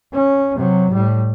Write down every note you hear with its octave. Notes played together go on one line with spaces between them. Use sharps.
C#4
C3 F#3
A2 G3